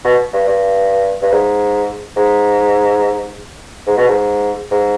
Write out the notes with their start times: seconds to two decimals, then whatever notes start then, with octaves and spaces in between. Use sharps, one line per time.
0.05 B2
0.33 G2
0.47 G2
1.22 G2
1.32 G#2
2.17 G#2
3.87 G#2
3.98 B2
4.08 G#2
4.72 G#2